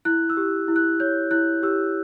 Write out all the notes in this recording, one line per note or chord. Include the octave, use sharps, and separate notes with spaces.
E4 F#6
E6
G4
E4
F#6
C#5 G6
E4 F#6
G4 E6